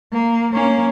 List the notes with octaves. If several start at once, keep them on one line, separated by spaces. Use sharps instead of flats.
A#3
A#3 C#4